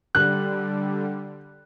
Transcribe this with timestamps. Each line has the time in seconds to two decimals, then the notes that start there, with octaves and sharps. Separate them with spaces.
0.15 D3 G3 F#6